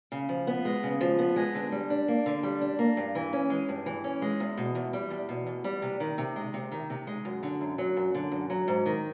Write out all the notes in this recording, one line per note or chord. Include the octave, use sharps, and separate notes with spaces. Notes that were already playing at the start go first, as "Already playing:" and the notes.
C#3
F3
B3
G#3
C#3
F3
B3
G#3
D3
G3
D4
A#3
D3
G3
D4
A#3
G2
E3
C#4
G#3
G2
E3
C#4
G#3
E2
B2
E2
G3
E2
B2
E2
G3
C3
D#3
C3
G#3
C3
D#3
C3
G#3
F#2
D3
F#2
F#3
F#2
D3
F#2
F#3
G#2
D#3